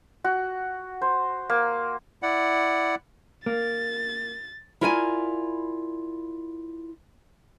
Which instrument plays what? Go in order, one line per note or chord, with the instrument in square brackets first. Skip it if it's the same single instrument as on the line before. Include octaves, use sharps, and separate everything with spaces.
[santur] F#4
C5
A#3
[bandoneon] E4 D5 F#5
[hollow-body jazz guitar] A#3 [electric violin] A6
[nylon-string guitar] E4 F4 A#4 D5 G5 G#5